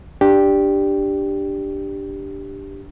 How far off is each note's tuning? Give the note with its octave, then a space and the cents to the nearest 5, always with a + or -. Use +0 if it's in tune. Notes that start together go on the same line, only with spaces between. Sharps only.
D4 +0 G4 +0